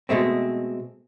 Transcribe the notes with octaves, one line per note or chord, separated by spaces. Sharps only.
B2 G#3 A3 C4